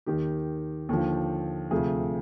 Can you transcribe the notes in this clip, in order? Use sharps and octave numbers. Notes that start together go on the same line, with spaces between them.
D#2 D#3 G4
D#2 D3 F3
D2 C3 F3 G#4